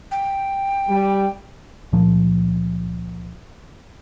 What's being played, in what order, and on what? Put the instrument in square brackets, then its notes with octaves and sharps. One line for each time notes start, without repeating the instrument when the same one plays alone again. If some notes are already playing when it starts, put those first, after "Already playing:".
[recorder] G5
[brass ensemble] G3
[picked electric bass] C#2 A#2 F3